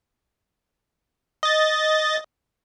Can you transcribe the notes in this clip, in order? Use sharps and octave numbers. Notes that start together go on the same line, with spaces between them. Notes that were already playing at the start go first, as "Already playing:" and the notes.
D#5 A6